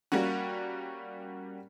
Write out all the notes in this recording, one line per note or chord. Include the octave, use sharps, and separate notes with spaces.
G3 A#3 C#4 F#4